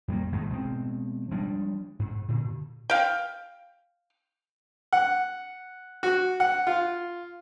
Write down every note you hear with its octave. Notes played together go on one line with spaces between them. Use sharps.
F2 G3 A#3
G#1 G#2 G#3 A3
B2 G#3 C4
F3 G3 G#3 D4
G#2
A#2 D3
F5 G5
F#5
F#4
F#5
F4